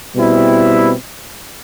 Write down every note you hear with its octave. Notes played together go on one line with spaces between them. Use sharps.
B2 G3 C4 E4